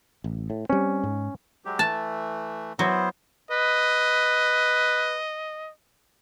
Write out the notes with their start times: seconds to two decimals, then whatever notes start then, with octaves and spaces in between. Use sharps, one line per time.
0.24 A1
0.50 A2
0.70 G3 C4 C#4
1.03 G#2
1.65 F#3 G#3 G4
1.79 E3 A3 A5
2.79 F#3 B3 E4 C5
3.51 B4 D#5